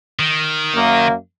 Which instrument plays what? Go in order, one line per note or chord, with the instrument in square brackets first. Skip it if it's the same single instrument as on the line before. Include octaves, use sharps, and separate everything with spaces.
[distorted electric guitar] D#3
[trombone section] F#2 A#3